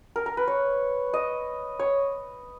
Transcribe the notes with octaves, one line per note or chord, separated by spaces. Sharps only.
A#4
A#4
B4
C#5
D#5
C#5